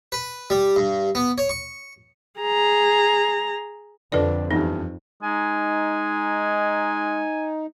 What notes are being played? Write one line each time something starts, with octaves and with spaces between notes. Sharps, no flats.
B4
G3
G2
B3
C#5
C#6
G#4 A#5
F2 D3 D4 B4 D5
E2 G2 D#4
G#3 D#4 G#5